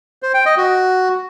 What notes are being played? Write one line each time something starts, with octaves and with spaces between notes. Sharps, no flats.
C5
G5
D#5
F#4